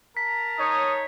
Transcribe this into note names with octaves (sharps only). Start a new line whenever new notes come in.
A#4 A5 A#5 B6
D#4 C#5 D#6